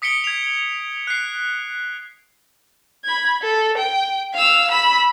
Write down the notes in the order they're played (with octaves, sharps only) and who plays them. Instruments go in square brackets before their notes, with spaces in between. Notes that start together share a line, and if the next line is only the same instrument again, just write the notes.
[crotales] D#6 B6 C#7 D7 G7
G#6 F7
F#6 C7
[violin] B5 G#6
A4
G5
F5 E6
B5 E6